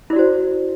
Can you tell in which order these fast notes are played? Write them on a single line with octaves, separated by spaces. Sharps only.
E4 D5 F#4 C5